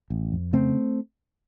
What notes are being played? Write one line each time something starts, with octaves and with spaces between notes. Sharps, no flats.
A1
F2
C#3 A3 C4